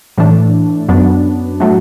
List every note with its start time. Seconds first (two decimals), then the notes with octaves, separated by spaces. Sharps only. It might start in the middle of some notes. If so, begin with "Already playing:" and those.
0.18 A2 E3 A3 D4
0.89 F#2 F#3 B3 D4
1.60 A2 F#3 A3